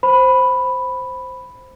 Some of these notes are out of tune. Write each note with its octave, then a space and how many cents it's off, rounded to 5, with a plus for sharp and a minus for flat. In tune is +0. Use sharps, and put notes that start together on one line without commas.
C5 +0 B5 +0